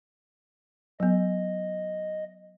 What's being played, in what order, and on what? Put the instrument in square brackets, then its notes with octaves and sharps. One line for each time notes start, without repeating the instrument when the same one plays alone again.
[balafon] F#3 B3 [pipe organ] D#5